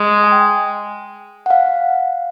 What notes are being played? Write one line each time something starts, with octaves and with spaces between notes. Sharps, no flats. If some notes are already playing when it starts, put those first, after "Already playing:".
Already playing: G#3
G#5
G5
F#5
F5